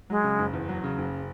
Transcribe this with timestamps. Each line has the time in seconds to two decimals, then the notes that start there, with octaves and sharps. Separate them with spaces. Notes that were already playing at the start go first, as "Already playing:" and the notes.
0.10 F#3 G#3
0.24 C#3
0.39 F#1
0.53 E2
0.69 F#3
0.84 C#3
0.98 F#1